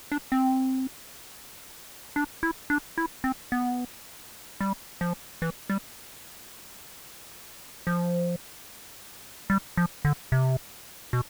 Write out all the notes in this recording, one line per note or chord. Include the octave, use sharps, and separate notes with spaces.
D4
C4
D4
E4
D4
E4
C4
B3
G3
F3
E3
G3
F3
G3
F3
D3
C3
B2